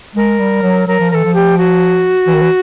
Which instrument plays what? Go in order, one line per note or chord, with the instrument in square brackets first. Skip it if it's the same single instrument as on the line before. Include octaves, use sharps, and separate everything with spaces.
[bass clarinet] G#3 [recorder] A#4
[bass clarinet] G3
F#3
[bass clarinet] F#3 [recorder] A#4
[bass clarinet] F3
[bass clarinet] E3 [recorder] A4 A#4
[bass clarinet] F3
[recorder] G4
F#4
[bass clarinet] E3
D#3
E3